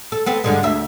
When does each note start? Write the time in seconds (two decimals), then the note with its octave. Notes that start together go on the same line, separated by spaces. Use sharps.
0.12 A4
0.26 B3 C4 A4
0.44 G2 D3 G#3
0.63 D2 E5